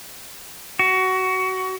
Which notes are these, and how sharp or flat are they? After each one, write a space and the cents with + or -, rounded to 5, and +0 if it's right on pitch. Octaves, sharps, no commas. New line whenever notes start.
F#4 +20